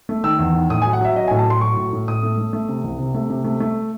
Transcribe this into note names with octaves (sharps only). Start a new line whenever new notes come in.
A3
D#3 E6
E2
D#3
A2 D#6
F#3 G#5
F#5
F#3 E5
F#3 D#5
A2 G#5
A5
A2 C6
F#3 C#6
A2
A2
A2 D#6
A3
A3
A3
C3
C2
C3
A3
C3
A3
A3